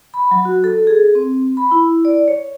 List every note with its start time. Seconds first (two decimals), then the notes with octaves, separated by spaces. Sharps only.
0.14 B5
0.31 F#3
0.45 F#4
0.64 A4
0.87 G#4
1.15 C4
1.57 B5
1.71 E4
2.05 D5
2.28 C#5